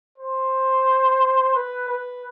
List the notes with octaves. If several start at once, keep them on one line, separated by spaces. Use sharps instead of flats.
C5
B4
B4